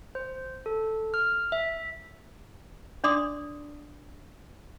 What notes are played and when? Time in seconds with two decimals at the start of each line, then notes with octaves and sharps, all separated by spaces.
0.15 C5
0.66 A4
1.14 F6
1.52 E5
3.04 D4 D5 C6 D6 D#6